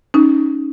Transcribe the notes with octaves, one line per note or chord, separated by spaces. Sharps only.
C#4 D#4